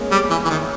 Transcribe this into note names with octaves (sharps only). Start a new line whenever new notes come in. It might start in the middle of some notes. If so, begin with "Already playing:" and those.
Already playing: G#3 A#3 B3 C#4
G3
E3
E3
D#3